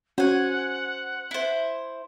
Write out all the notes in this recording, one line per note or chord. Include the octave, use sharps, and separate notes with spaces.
C#4 F#4 C5 F#5 G#5
E4 C5